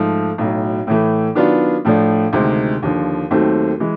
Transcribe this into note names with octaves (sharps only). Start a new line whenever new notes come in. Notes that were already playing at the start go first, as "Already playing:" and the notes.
Already playing: G#2 F3 A3
B1 A2 F#3
A2 E3 A3
D#3 F#3 B3 D4 F4
A2 F3 A3 D4
D2 C3 D#3 G#3 C4
D#2 D3 F3
D#2 D#3 F#3 A3 C4
E3 G#3